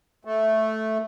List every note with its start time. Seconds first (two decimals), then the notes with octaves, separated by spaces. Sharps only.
0.25 A3